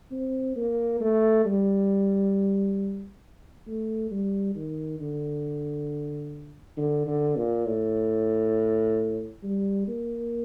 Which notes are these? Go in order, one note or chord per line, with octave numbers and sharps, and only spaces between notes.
C4
A#3
A3
G3
A3
G3
D#3
D3
D3
D3
A#2
A2
G3
A#3